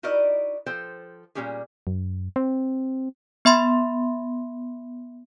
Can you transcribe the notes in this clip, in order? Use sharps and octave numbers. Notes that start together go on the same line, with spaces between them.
D#4 E4 F#4 A#4 D5 D#5
F3 A4 C5 G5
A#2 G3 C#4 G4 G#4
F#2
C4
B3 E5 B5 C6